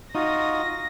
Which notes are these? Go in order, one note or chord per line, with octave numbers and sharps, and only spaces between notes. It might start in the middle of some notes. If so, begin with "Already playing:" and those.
D#4 F4 F#4 D#6 A#6